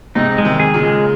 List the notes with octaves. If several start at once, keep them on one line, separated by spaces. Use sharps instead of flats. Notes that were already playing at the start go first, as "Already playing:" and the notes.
G#2 C3 D#4
G#3
C3 D#3
G#4
A#2 C#3
G#3